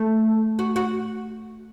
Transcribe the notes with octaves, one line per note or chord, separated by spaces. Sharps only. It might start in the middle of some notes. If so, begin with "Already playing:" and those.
Already playing: A3
F#4
F#4